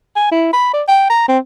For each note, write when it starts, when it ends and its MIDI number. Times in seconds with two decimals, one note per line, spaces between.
0.16 0.29 80
0.32 0.53 64
0.53 0.73 83
0.73 0.83 74
0.88 1.07 79
1.10 1.26 82
1.28 1.38 60